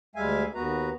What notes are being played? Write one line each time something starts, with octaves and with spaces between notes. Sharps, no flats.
D2 G3 G#3 E5 F5 G#5
D#2 B3 F#4 B4 A#5